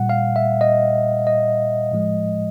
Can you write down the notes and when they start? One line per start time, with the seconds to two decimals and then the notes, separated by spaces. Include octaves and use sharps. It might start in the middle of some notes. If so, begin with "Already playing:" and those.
Already playing: A#2 G3 F#5
0.09 F5
0.36 E5
0.61 D#5
1.27 D#5
1.91 A2 F3 G#3